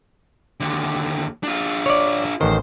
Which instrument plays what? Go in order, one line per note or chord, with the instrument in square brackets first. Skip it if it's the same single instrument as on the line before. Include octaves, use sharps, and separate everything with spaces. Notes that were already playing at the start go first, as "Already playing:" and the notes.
[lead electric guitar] D#2 D3
D4 F4
[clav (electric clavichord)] C#5 D5
[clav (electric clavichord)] A1 D#3 [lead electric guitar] C5